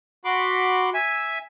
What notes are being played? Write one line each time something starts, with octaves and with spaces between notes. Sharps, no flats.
F#4 B5 C6 D6
E5 G#5